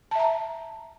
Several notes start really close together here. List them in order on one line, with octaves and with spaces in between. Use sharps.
A5 E5 A#5